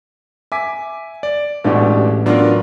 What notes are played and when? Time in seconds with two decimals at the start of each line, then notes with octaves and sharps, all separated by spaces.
0.52 E5 G#5 D6 B6
1.23 D5
1.64 A1 B2 G#3 A3 D4 G4
2.26 F#3 B3 D4 F4 A#4